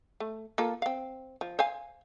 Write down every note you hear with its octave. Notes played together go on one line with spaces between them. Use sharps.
A3
A#3 F4 A4
C4 F5
F3
C5 F5 G#5